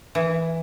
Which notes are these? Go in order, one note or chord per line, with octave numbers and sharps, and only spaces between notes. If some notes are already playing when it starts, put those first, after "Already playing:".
E3